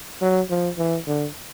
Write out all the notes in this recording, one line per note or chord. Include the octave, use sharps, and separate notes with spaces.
F#3
F3
E3
D3